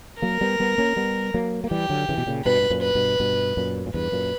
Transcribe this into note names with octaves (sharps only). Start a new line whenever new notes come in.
F#3 A#3 A#4
G3 B3
G3 B3
A#3 C#4
G3 B3
F#3 A#3
A#3
E3 G3 G4
D3 F#3
C#3 E3
B2
A#2 C#3
G2 B2 B4
B2
F#2 A#2
B4
G2 B2
G2 B2
F#2 A#2
A#2
E2 G2 B4
F#2 A#2